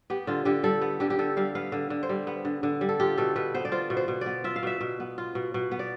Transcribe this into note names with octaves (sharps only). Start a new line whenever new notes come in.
B3 G4
D3 F4
D3 G4
G3 A4
B3
D3 G4
G4
D3 A4
G3 F5
B3 F5
D3
D3
C5
G3
B3
D3
D3
G3
A4
F4 G4
B2 A4
B2 B4
B3 C5
D5
F4 C5
B2
C5
B2
B3 D5
F4 E5
F5
B2 E5
B2
B3
F4
B2
B2
B3
D5